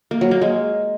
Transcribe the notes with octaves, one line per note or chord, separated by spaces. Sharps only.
A#3
F#3
A#3
G#3